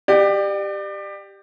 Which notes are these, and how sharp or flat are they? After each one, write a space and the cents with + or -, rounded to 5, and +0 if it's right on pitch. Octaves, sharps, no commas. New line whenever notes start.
G4 +5 D5 +30 G5 -45